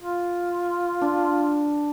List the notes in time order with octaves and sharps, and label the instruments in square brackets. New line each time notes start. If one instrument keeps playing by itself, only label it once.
[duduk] F4
[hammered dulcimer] D4